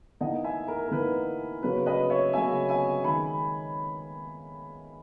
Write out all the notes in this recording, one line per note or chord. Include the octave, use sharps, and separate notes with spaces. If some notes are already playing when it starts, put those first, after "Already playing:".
E3 A#3 D#4 D#5 F#5
E5 G#5
A#4
A#4
E3 A#3 D#4 B4
C#3 F#3 A#3 C#4 B4
B4 D#5
C#5 E5
C#3 F#3 A#3 C#4 E5 G#5
E5 G#5
D#3 G#3 G#5 B5